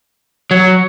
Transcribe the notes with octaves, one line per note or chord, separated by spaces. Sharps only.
F#3 C#5